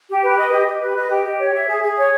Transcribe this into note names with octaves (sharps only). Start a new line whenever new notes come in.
G4
B4
D#5
G4
G4
B4
D#5
G4
G4
C#5
E5
G#4
G#4
C#5